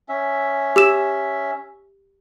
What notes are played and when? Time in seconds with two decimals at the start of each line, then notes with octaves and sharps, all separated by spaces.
0.09 C#4 E5
0.76 G4 E6 E7